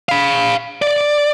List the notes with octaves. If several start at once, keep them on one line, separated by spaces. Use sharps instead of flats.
F5 B5
D5